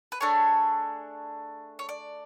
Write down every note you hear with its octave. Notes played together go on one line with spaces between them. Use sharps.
B4
A3 D4 G#4 C#5
C#5
D5